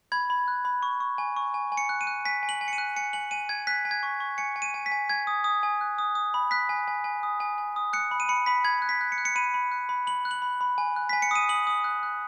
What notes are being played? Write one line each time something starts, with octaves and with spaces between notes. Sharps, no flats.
B5 G#6
B5
F#6
B5
C#6
C#6
G#5
C#6
G#5
G#5
C#7
F#6
D#7
F#6
G#5 B6
G#5
F#7
G#5
C#7
D#7
F#6
G#5 C#7
G#5 F#7
G#5 D#7
G#5 G#6
F#6 B6
G#5
G#6
C#6
C#6
G#5 C#7
G#5
D#7
G#5
B6
G#5
G#5 G#6
D#6
D#6
G#5
F#6
D#6
D#6
B5
F#6 B6
G#5
G#5
G#5
D#6
G#5
G#5
D#6
F#6 C#7
B5
D#7
B5 C#7
B5 B6
B5 G#6
F#6
B6
F#6
C#7
F#6
C#7
B5 D#7
B5
F#6
B5
B5 F#7
F#6
F#7
B5
B5
G#5
F#6
G#5 B6
C#7
D#6 D#7
D#6 F#7
D#6
F#6
F#6